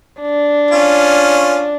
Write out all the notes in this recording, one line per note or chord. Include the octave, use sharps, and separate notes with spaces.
D4
C#4 F4